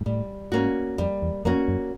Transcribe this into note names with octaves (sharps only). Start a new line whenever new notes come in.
G#2
A2 G3
G#2 A#3 C#4 F#4
F2 G3
E2
F2 A#3 C#4 F#4
F#2